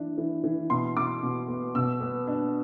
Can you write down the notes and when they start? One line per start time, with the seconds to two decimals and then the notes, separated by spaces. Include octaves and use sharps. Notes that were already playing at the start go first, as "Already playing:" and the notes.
Already playing: E3 D4
0.18 E3
0.44 E3
0.70 B2 C6
0.96 B2 D6
1.23 B2
1.48 B3
1.75 B2 E6
2.01 B3
2.27 D4